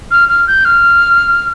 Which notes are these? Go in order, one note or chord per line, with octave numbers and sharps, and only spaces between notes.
F6
F6
G6
F6